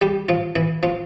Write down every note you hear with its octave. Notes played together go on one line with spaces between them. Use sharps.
G3 G4
F3 F4
E3 E4
F3 F4